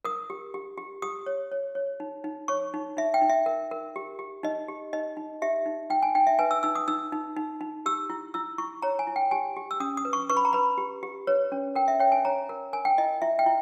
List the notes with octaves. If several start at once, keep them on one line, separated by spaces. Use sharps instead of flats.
A#4 D#6
G4
G4
G4
G4 D#6
C#5
C#5
C#5
D#4
D#4
C#5 C#6
D#4
D#4 E5
G5
D#4
E5
A#4
A#4
G4
G4
D#4 D#5
G4
D#4 D#5
D#4
G4 E5
D#4
D#4 G5
G#5
D#4 G5
E5
B4 G#5
E6
D#4 E6
D#6
D#4 E6
D#4
D#4
D#4
G4 E6
E4
E4 E6
E4 C#6
C#5 A#5
G#5
E4
G5
G4 G#5
G4
E6
C#4 D#6
D#6
B4
C#6
B4 C#6
B5
A#5
B4 B5
G4
G4
B4 C#5
C#4
A#4 G5
E5
C#5 G5
G#5
C#5 A#5
A#4
A#4 G#5
G5
E4 D#5
E4 E5
G5
E4